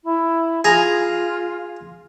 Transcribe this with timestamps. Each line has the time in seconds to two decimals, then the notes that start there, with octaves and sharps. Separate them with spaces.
0.04 E4
0.64 F4 G#4 A#5